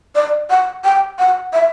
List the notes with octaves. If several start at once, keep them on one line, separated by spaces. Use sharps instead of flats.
D5
F#5
G5
F#5
E5